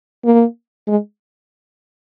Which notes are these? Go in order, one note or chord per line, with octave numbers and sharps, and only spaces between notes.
A#3
G#3